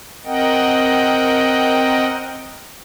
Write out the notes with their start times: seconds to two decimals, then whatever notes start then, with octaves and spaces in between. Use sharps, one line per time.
0.24 C4 A#4 D#5 F#5 G5